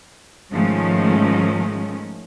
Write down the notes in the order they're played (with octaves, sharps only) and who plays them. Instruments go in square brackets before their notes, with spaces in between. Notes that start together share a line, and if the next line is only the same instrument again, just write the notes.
[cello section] G#2 D#3 F3 G#3 A3 C#4